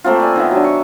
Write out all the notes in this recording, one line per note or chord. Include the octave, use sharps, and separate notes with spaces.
A3 A#3 C4 F4
D5 G#5
D#3 B3 E5
F#3 D4
C#6